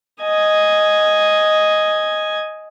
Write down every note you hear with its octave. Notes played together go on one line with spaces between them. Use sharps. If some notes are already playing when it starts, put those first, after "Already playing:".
D#5 G#5